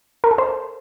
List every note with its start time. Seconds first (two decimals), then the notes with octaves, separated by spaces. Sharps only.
0.24 A#4
0.31 A4
0.38 C5